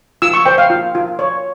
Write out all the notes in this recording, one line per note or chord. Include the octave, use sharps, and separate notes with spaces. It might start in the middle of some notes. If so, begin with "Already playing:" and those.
F4 E6
C#6
C5 G5
F5
F4
F4
C#5